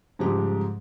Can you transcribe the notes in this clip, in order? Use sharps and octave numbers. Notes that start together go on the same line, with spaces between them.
G#2 C#3 F3 G3 G#3 G4